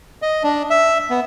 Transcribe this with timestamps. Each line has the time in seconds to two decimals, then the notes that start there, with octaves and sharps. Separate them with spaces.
0.22 D#5
0.43 D4
0.70 E5
1.10 B3